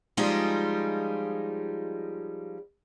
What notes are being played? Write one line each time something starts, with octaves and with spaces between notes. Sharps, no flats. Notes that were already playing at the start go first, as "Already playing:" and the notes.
F3 G3 G#3 C#4 D#4 F4